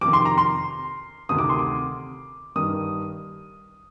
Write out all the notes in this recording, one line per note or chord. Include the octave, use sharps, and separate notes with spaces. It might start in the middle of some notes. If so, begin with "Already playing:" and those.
F2 C3 D#3 D6
C6
A#5
C6
D2 C3 D#3 D#6
D6
C6
D6
G2 D#3 D#6